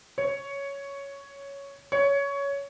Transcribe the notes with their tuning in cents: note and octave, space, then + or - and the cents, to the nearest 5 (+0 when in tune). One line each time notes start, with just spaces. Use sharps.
C#5 +5
C#5 +15